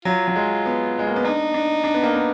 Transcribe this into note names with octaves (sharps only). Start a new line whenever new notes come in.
F#3 F4
F#3
G#3
B3
G#3
A#3
B3
D4 D#4
D4
D4
B3
A#3
B3